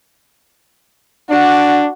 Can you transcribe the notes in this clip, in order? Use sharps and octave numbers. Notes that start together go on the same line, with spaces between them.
D4 F#4